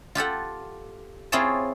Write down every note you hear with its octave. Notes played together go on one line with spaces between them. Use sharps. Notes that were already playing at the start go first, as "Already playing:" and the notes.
F4 G4 A4 F#5
C4 E4 F4 G#4 C#5 A5